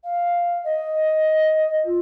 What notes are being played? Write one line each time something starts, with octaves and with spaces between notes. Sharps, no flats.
F5
D#5
F4